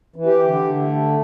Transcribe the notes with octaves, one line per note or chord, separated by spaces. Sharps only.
E3
G4
D3
A3